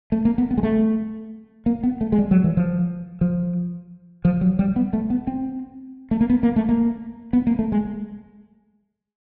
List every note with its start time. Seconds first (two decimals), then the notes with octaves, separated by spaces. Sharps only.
0.12 A3
0.25 A#3
0.38 B3
0.51 B3
0.57 G#3
0.63 A3
1.66 A#3
1.83 B3
2.01 A3
2.12 G#3
2.18 G3
2.31 F#3
2.44 E3
2.57 F3
3.21 F3
4.25 F3
4.41 F#3
4.59 G3
4.76 B3
4.93 A3
5.10 B3
5.27 C4
6.11 A3
6.21 A#3
6.30 B3
6.43 A#3
6.56 A3
6.69 A#3
7.33 B3
7.47 A#3
7.59 A3
7.72 G#3